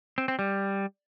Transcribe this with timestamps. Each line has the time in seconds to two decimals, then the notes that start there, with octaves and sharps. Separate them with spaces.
0.18 C4
0.28 C4
0.39 G3